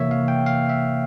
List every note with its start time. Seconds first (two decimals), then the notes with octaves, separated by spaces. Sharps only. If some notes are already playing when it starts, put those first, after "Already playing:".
Already playing: C3 E3 A#3 C#5 E5
0.11 F5
0.28 G5
0.46 F5
0.70 E5